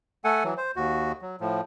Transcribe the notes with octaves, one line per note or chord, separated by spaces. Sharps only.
A3 A4 F#5 G#5
E3 F#3
C5
D#2 F#4
F#3
A2 F3